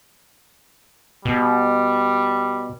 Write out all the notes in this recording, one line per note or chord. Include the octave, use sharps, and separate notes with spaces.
B2 G3